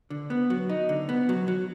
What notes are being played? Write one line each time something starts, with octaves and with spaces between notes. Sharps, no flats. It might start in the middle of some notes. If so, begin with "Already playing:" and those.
D3
B3
F#3
D#4
D3
B3
F#3
F#3